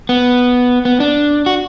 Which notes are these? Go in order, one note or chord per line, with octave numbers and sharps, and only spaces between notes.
B3
B3
D4
F#4